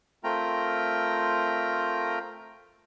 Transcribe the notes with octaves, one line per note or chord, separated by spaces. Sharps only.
A3 C4 F4 A#4 G5 A#5